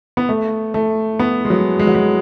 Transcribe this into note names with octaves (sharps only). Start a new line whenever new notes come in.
B3
A3
A3
B3
G#3
F#3
G#3
F#3
G#3